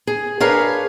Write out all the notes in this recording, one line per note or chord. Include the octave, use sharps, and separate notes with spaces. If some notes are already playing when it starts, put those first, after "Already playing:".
G#4
D4 G#4 A#4 B4 C#5 F5